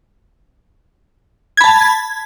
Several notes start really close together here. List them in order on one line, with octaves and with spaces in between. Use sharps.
G#6 B5 A5